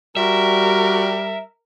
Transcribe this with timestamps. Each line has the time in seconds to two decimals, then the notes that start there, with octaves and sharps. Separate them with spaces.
0.17 G3 F#4 A#4 E5